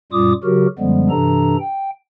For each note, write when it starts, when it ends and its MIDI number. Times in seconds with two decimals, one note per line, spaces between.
0.12 0.33 42
0.12 0.33 46
0.12 0.33 55
0.12 0.33 65
0.12 0.33 86
0.12 0.33 87
0.44 0.67 49
0.44 0.67 54
0.44 0.67 66
0.44 0.67 67
0.44 0.67 70
0.79 1.10 42
0.79 1.10 50
0.79 1.10 53
0.79 1.10 55
0.79 1.10 56
0.79 1.10 59
1.10 1.56 43
1.10 1.56 48
1.10 1.56 52
1.10 1.56 62
1.10 1.56 69
1.10 1.56 82
1.60 1.90 79